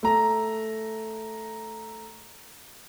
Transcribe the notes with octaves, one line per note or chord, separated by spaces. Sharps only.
A3 A#5